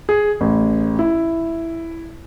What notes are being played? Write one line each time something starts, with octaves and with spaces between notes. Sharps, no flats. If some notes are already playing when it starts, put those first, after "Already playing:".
G#4
A1
E4